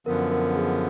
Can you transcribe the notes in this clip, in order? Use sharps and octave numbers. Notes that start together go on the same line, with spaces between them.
F#2 D3 F3 B3 A#4
A#4
G#4